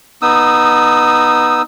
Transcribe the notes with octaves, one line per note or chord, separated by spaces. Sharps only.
B3 D#4 D#6 E6